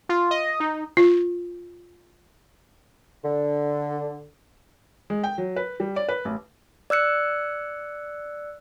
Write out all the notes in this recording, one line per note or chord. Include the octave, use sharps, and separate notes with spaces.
F4
D#5
D#4
F4
D3
G#3
G5
F#3
B4
G3
D5
B4
A1
D5 E6 F#6 C#7